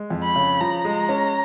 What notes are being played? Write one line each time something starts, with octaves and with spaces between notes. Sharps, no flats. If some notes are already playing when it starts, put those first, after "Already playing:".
Already playing: G#3
F2
B5
C#3
F3 A#5
G#3
C#4